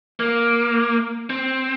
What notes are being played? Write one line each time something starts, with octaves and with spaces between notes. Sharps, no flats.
A#3
C4